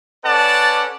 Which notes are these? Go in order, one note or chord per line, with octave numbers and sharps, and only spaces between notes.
C#4 A4 B4 D5 F#5 A5